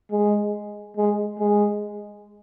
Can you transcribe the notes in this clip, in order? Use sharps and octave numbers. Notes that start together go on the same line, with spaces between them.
G#3
G#3
G#3